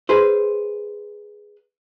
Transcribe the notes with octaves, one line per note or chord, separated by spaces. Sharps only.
G#4 B4 C5